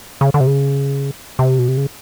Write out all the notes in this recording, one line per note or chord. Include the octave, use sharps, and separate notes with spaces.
C#3
D3
C3
C#3
C3
B2
C3
C#3